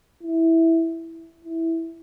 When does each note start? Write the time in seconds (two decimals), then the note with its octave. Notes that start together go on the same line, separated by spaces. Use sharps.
0.23 E4
1.45 E4